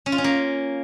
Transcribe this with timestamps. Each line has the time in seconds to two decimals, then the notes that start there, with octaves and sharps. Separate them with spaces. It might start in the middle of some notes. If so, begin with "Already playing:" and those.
0.06 C#4
0.12 F4
0.18 C#4
0.24 A#3